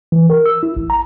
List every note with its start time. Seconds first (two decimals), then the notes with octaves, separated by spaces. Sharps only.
0.12 E3
0.30 A#4
0.46 E6
0.63 E4
0.77 A1
0.90 A#5